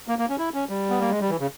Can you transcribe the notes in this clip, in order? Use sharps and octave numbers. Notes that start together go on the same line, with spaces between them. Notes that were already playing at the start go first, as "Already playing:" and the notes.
A#3
A#3
C#4
E4
C#4
G3
B3
A#3
G#3
G3
E3
C#3